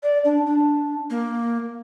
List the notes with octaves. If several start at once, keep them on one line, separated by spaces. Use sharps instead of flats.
D5
D4
D4
A#3